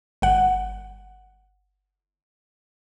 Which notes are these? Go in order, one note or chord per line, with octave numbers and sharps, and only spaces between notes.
G1 F#5